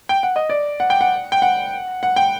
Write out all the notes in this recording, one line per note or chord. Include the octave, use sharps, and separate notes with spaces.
G5
F#5
D#5
D5
F#5
G5
F#5
G5
F#5
F#5
G5